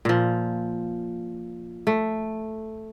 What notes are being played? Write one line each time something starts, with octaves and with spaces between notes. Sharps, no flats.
A#2 F3
A3